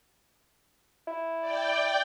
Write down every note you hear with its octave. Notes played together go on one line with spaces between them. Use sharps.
E4
D5 G5